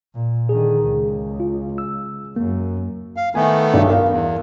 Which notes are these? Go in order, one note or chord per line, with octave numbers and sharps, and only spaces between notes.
A#2
D3 D#3 G#4
C#2
F4
E6
F#2 A#3
F5
D#3 A3 B3 G#5
B1 G2
A#4 F5
E2